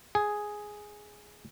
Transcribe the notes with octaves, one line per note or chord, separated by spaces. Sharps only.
G#4